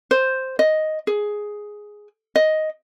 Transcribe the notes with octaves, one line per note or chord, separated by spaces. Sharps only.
C5
D#5
G#4
D#5